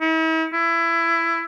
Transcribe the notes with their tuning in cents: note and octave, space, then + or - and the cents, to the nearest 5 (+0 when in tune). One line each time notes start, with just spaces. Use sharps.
E4 -45
E4 +20